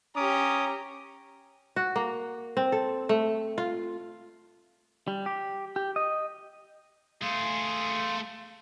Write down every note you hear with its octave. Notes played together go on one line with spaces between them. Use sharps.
C#4 G4 A#5 D6 D#6
F#4
A#3
C4
A4
A3
F4
G3
G4
G4
D#5
A3 G#4 F5 C6